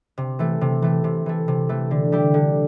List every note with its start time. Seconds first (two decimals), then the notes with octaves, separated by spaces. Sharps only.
0.18 C3
0.39 E3 A3
0.61 C3
0.82 E3 A3
1.04 C3
1.26 E3 A3
1.48 C3
1.69 E3 A3
1.91 D3
2.12 G3 E4 G4
2.34 D3